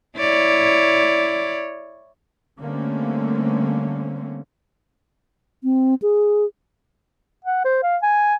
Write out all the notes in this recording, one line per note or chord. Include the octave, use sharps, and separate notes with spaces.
E4 C#5 D5
D3 G3 A3 A#3 C4 C#4
C4
G#4
F#5
C5
F5
G#5